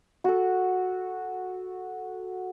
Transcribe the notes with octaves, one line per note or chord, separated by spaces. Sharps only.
F#4 A4